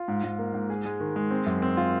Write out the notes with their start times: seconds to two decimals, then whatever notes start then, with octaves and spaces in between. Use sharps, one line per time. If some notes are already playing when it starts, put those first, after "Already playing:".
Already playing: F4
0.08 G#2
0.23 G#2
0.39 A#3
0.54 G#2
0.70 G#4
0.85 G#3
1.00 D#3
1.16 G#3
1.31 C4
1.46 F#2
1.62 C4
1.77 F4